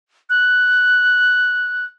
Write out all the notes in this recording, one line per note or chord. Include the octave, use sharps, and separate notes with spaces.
F#6